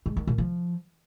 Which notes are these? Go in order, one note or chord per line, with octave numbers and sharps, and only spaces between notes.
G#2
D#3
A#2
F3